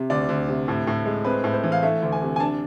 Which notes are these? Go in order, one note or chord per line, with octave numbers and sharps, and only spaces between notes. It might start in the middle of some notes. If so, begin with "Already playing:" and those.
Already playing: C3
D2 D5
D2
C3
A2
A2
G#3
C4 B4
A2
C5
E3
F5
A3 E5
D2
G#5
C3
G#5
D4 A5